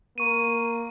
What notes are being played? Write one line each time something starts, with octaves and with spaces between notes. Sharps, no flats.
A#3 C#6 D#7